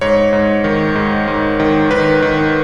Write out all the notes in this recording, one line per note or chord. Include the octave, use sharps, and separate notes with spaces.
G#2 C#5
G#2
D#3
G#2
G#2
D#3
D#3 B4
D#3